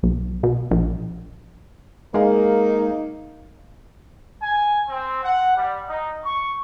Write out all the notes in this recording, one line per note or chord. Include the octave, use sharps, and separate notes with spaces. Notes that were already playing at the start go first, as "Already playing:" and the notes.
B1
B2
A#1
G#3 A#3 D#4 G#4 A#4 F5
G#5
C4
F#5
G3
D#4
C#6